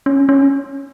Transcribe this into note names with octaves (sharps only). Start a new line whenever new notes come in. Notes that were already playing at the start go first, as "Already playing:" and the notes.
C#4
C#4